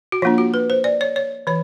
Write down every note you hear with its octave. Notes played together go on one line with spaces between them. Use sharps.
F#4
F3 A#3 D4 F4
F#4
B4
C5
D5
C#5
C#5
E3 C#5